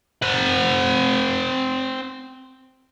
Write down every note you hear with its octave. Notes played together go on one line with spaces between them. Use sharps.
C4 F#5